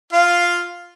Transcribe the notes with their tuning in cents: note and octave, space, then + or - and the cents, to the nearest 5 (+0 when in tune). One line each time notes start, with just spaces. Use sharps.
F4 +5 F5 +0